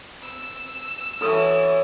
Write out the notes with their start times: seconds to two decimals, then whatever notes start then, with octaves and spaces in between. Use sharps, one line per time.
0.24 E6
1.21 E3 C#4 F#4 A4 D#6